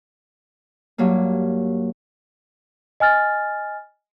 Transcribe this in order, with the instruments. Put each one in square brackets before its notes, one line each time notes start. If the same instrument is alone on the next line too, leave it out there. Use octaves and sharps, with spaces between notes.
[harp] G2 F#3 A#3
[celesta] D#5 G#5 F6 A6